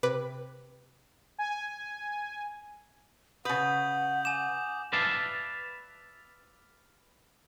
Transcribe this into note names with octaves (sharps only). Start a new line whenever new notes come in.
C3 B4 D6
G#5
C#3 B4 F#5 D#6 G6 F#7
G#5 D6 E7
B4 D5 E5 F5 A5